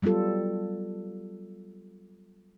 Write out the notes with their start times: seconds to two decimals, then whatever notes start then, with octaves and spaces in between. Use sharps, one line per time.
0.02 F#3 G3 B3 F4 A4